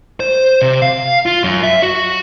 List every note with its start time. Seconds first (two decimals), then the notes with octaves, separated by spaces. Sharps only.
0.20 C5
0.62 C3
0.82 F5
1.26 F4
1.44 F#2
1.63 E5
1.82 F#4